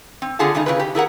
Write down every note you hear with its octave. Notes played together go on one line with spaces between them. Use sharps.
C4
D3 F4 G#4 F#5 G#5 A5
C#3 G#3 A3 D#4
C#3 E4 G#4 B4
G4
E4 G#4 A#4 F#5